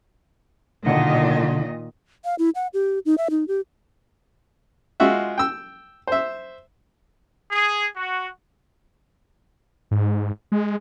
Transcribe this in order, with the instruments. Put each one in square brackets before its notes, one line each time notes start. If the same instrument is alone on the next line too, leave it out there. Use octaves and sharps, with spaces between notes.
[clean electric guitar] B1 D3 F#5 [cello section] A#2 D#3 D#5
[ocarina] F5
E4
F#5
G4
D#4
E5
D#4
G4
[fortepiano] G#3 F4 F#4 E5
G5 E6
C5 E5
[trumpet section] G#4
F#4
[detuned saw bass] G#2
G#3